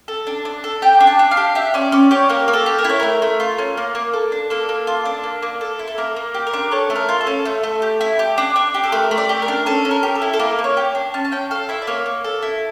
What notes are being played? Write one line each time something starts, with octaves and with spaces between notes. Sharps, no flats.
A4
D4
D4
A4
G4 G5
D4
A5
D4
F5
G4
G4 E5
C#4 D5
C#4 D5
G4 C#5
A#3 A#4
A#3
A4
G4
A#4
E4 C#5
A3 A#4
A3
F4
C#4
A#3
A#3
A4
D4
A#3 A4
A#3
F4
D4
A#3
A#3
A4
E4
A4
A#3 A#4
A#3
G4
A#4
D4
A4 C#5
A3
A#4
F4
A4
C#4
A3
A3
G4
E4
G4
D4
D4
G4
A4
A3 A#4
A3
D5
G4
A#4
D4
C#4 A4
C#4
A#4
G4
A4
E4
A4
A#3 A#4
A#3
C#5
G4
D4
C#4 A5
A5
C#4 G5
A4 F5
E4 E5
D5
A#3 C#5
A#3
A4
E4